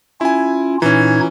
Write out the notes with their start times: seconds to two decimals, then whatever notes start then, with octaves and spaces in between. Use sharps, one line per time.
0.21 C#4 E4 F4 G#5
0.82 A#2 E3 C#4 D#4 G#6